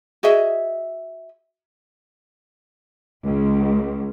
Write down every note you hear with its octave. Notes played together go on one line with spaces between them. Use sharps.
F#4 G#4 D#5 E5
C#2